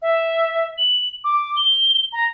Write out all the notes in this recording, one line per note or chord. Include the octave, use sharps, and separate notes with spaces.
E5
F#7
D6
G7
A#5